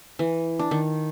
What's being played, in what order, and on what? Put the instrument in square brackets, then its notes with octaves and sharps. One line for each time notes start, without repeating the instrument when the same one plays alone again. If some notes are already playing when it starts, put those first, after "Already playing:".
[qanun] E3
D4
D#3